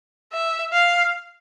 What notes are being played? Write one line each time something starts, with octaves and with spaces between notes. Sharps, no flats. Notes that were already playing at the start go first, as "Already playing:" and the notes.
E5
F5